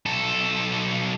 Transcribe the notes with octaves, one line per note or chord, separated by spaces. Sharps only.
B1 A4